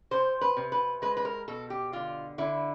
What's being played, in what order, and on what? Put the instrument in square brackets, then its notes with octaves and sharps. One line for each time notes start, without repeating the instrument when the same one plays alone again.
[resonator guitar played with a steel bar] C3 C5
B4
C3
B4
G#3 B4
B4
A#4
B2 A4
G4
D3 F4
D3 E4